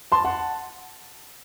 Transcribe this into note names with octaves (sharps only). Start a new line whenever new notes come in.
A5 C6
F#5 A5